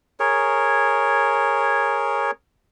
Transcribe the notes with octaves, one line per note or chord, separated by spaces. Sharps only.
G#4 A#4 C#5